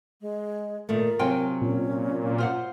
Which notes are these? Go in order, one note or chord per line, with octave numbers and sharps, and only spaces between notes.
G#3
A#2 D#3 A3 A#4
C3 F#3 F4 G5 G#5
A#2 C#4
F4 C5 F#5